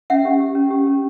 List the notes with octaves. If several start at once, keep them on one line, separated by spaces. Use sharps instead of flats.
C#4 E5 F#5
G4
G4
C#4
G4
C#4